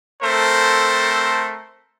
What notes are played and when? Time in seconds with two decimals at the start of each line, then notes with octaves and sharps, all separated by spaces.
0.22 A3 C4 A4 A#4 C5